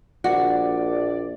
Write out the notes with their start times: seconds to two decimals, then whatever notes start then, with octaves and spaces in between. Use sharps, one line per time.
0.24 A#1 F#4 D5